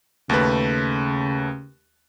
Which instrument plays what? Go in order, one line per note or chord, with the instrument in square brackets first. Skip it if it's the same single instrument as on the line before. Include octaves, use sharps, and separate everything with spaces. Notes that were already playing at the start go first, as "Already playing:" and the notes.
[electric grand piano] D#2 A3 B4 [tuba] C#3